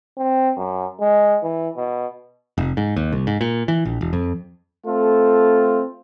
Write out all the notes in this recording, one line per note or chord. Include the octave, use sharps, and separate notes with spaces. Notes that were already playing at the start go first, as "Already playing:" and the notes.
C4
F#2
G#3
E3
B2
F1
G#2
D#2
C2
G#2
A#2
E3
A#1
E1
F2
A3 C4 F4 A4